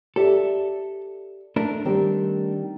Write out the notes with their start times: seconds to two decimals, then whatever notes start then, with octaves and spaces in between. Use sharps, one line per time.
0.16 G4 A4 D5 E5
1.56 A3 D4 A#4
1.85 D#3 G3 C4